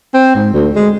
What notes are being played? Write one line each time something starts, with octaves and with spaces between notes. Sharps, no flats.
C4
G#2
D2
G#3